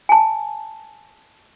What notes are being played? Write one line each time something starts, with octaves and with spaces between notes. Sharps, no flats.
G#5 A5